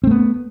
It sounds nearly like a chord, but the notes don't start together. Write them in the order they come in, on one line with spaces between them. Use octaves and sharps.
C4 A3 B3